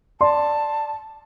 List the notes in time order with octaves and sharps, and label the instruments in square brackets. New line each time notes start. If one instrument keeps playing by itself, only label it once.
[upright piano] D5 C6 [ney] A5